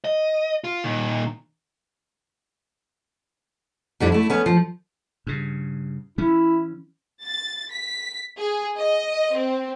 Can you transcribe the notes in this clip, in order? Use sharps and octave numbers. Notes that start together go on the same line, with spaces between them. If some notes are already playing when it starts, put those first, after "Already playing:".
D#5
F4
A#2 D#3
F2 G3 D4 E4
A3 E4
B3 C#4
F3
G2 C#3
E3 C#4 E4
A6
B6
G#4
D#5
C4